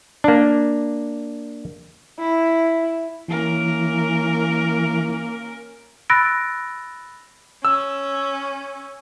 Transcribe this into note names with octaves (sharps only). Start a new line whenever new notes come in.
A#3 D4
E4
E3 A#3 C#4 A#4
B5 E6 F#6 A6 A#6 D7
C#4 E6